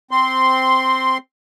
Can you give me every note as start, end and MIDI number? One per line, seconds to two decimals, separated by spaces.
0.11 1.18 60
0.11 1.18 84